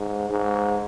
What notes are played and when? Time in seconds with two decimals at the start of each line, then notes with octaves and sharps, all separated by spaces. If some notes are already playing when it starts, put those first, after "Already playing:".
Already playing: G#2
0.30 G#2